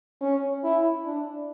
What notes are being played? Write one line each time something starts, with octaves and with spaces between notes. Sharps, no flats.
C#4
E4
D4